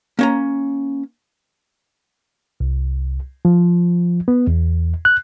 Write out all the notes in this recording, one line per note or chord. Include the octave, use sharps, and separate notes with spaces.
A#3 C#4 A#5
C2
F3
B3
E2
F#6